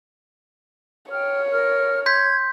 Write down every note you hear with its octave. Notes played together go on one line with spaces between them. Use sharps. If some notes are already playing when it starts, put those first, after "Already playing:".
C#5 G5 F6
A#4 F6
C6 G6 G#6 B6